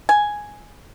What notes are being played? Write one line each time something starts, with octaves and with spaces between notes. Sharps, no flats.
G#5